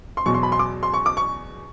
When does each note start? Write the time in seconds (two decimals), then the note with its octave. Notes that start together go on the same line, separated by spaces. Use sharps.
0.17 C6
0.26 E2 B2 F#3 C#6
0.34 C6
0.43 B5
0.52 C6
0.59 D6
0.83 C6
0.94 C#6
1.06 D6
1.17 C#6